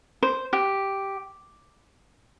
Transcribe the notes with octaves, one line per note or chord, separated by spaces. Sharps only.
C5
G4